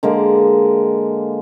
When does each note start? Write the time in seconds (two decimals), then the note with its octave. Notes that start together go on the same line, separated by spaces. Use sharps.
0.03 D3 G#3 A#3